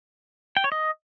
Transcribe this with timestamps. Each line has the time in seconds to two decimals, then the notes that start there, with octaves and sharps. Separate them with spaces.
0.57 G5
0.64 C#5
0.72 D#5